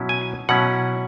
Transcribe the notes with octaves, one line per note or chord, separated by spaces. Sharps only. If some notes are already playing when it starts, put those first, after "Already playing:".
Already playing: B2 F#3 C#4 E4
G#5
B2 F#3 C#4 E4 F#5